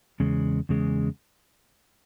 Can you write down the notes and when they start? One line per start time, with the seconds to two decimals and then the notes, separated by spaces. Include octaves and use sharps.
0.20 E2 C#3 G#3
0.69 E2 C#3 G#3